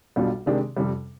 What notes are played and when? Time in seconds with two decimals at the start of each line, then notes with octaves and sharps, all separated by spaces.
0.16 B1 B2 G3 D4 F4
0.46 C3 D#3 G#3 D4 G4
0.77 F2 C3 G3